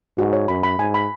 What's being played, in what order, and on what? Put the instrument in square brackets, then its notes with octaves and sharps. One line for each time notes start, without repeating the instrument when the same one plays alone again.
[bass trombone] G#2 [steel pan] F#4
[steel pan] C#5
[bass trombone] F#2 [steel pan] B5
[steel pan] B5
[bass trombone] G#2 [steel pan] G#5
[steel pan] B5